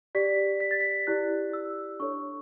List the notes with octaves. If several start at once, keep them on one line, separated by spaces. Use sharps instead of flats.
G4 D5 B6
B6
A6
B6
E4 G4 D5 F#6
E6
D4 A4 C#5 C#6